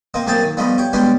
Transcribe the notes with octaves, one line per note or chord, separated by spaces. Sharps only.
A#3 C4 D#5
F#2 C3 A#3 G#4 G5 A5
D#3
F3 G3 A3 B3 D#5
G4 C#5
B2 G3 G#3 C#4 D4 G4